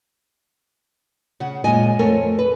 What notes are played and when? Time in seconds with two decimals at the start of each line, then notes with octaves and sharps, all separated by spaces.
1.40 C#3 F#5
1.64 F#2 A#2 G#3 D#5 G#5
1.99 F2 A3 A4 A#4 C#5 G#5
2.39 B4